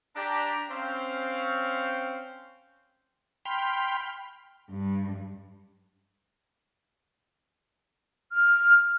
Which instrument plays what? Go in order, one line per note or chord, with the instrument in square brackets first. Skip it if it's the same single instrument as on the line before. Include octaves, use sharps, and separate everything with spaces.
[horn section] D4 G4 A#5
C4 C#4 F5
[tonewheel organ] G5 B5 C6 F6
[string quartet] G2
[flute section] F6